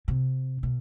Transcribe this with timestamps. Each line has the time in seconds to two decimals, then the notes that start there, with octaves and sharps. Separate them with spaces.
0.08 C3
0.63 B2